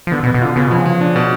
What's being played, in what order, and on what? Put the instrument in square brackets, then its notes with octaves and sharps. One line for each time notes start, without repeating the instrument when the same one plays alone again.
[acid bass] F3
[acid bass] D3 [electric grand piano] B3
[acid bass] B2
[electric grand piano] B3
[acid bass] B2
[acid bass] D3 [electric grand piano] F4
[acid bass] C#3 [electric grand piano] B3
[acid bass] B2 [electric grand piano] F3
[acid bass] C#3
[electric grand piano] F3
D4
B2